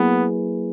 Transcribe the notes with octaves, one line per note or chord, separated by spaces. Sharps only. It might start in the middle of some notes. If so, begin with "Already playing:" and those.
Already playing: F#3 A#3 B3 E4 G#4 B4